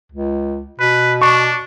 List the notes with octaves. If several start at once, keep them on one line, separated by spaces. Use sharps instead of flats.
C#2
B2 B4
D4 C#6